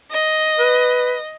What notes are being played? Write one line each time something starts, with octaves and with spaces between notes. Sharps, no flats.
D#5
B4